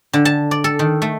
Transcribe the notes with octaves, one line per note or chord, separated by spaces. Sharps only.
D3
A5
D5
A4
D#3
A3